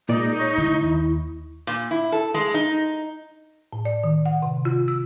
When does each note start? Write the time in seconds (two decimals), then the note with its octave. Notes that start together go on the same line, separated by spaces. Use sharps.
0.09 A#2 G#3 D#4 D5
0.39 C#5 C#6
0.58 D3 G#3 A3 E4
0.81 D#2 D#3
1.67 A#2
1.91 E4
2.12 A4
2.34 G#3
2.54 D#4
3.72 A2
3.85 D5
4.04 D#3
4.26 F#5
4.42 C3
4.65 F4
4.88 E6